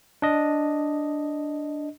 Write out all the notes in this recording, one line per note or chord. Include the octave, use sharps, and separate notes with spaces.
D4 D#5